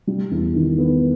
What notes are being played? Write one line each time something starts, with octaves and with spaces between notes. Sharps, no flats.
G3
E2
D#3
B3